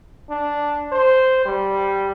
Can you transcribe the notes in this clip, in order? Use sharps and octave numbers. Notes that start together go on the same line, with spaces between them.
D4
C5
G3